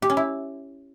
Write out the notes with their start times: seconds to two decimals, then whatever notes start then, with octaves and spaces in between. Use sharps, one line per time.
0.02 G4
0.10 C#4
0.17 E4